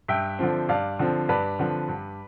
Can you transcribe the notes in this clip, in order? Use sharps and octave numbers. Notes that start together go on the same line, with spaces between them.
G2 E5 G5
D3 F3 C4
G2 D5 F5
D3 F3 C4
G2 B4 D5
D3 F3 C4
G2